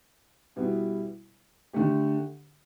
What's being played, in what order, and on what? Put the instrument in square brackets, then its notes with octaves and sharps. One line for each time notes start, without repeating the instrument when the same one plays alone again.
[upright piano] B2 G3 B3 E4
D3 A3 G4